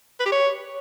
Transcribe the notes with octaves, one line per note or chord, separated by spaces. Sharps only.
B4
G4
C#5